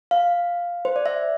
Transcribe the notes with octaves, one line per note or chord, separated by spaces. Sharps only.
F5
C5
D5
E5